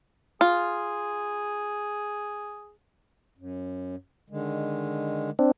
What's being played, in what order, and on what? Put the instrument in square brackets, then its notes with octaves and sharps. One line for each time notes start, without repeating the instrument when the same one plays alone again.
[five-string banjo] F4 [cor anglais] G#4
[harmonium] F#2
D3 D#3 G#3
[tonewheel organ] C4 D4